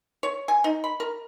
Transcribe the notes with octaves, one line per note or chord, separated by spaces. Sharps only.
C#5
G#5
D#4
B5
A#4